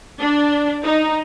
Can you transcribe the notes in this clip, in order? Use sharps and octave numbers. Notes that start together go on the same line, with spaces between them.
D4
D#4